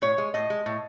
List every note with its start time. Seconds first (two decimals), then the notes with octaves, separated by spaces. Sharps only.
0.02 A2 C#5
0.18 G#3
0.34 A2 D#5
0.50 G#3
0.66 A2